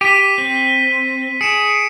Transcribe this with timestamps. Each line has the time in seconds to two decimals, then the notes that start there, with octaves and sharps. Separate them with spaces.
0.01 G4 B6 D#7
0.38 C4
1.41 G#4 C#7 D7 E7